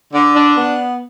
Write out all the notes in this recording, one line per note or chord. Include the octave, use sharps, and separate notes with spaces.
D3
D4
B3